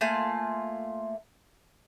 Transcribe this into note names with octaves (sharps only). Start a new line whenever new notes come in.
A3 A#3 F4 G#5